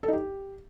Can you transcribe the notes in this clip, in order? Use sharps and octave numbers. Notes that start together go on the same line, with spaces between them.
A4
D#4
G4